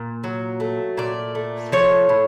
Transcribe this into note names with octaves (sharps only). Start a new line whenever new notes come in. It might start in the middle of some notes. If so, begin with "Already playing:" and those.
Already playing: A#2
F#3
A3
A#2 D5
A3
F3 C#5
A2